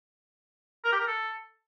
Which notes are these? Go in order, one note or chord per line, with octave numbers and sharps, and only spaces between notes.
A#4
G4
A#4
A4